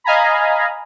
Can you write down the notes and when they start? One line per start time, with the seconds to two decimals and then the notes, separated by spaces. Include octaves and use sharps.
0.04 D#5 F5 G#5 A#5 B5